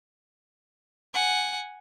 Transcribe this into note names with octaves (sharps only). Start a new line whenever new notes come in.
F#5 G#5